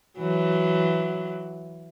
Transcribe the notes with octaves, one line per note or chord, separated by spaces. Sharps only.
E3 F#3